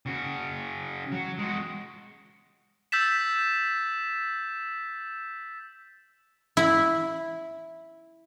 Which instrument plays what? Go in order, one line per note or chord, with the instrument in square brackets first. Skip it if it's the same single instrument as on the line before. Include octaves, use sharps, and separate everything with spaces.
[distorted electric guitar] C#3 F#4
F#3
G#3 F#4
[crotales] E6 G6 A6 B6 E7
[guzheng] E4 B5